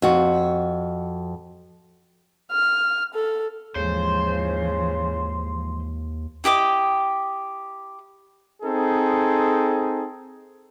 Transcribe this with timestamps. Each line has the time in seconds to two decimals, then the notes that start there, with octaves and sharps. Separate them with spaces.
0.02 F2 F#4
2.52 F6
3.14 A4
3.75 D#2 G#2 C#3 E3 F3 C5
6.44 E4 G4 D#5 D6
8.63 C4 D#4 G#4 A4